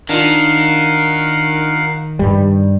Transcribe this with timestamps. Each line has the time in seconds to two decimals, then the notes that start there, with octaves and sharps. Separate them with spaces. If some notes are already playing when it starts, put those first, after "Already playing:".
0.09 D#3 D4 D#4 F4 A#4 F5 F#5
2.19 G2 G3